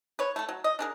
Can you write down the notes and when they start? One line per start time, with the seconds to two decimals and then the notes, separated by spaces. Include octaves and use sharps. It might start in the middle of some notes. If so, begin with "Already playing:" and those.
0.19 B4 C#5
0.36 A3 A4
0.49 F#3
0.64 D#5
0.79 D4 G#4 A#4